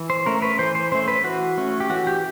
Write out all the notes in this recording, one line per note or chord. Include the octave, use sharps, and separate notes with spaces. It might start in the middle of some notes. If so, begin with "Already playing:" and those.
Already playing: E3
C5
A3 C#4 A#4
B4
E3 C5
C5
A3 C#4 C5
B4
E3 F#4
A3 C#4
G4
E3 F#4
G4